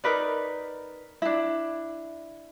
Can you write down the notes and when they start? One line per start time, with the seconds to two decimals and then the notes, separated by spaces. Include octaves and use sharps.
0.04 D#4 A#4 B4 D5
1.22 D4 E4